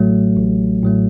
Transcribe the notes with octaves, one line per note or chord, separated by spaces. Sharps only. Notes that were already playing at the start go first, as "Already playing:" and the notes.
Already playing: A1 A2 F#3 A3
A1
A2 F#3 A3